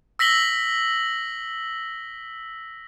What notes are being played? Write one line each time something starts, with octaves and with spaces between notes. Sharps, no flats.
E6 A#6 B6 F#7 G7